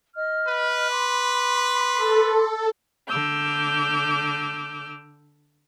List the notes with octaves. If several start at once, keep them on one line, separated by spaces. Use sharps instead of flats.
D#5 F6
B4
B5 C6 D6
A4
D3 D6 E6 F6 G6